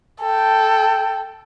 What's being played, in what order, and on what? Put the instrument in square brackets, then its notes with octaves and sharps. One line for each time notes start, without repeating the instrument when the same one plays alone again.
[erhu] A4 [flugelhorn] G5